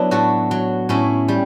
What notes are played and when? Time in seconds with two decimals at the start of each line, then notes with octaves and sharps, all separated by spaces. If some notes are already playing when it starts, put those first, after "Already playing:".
Already playing: F#3 B3 D4 E4
0.11 A2 F#4 A4
0.51 F#3
0.89 A2 C#4 E4
1.28 G3